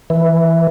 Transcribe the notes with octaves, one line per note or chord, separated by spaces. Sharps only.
E3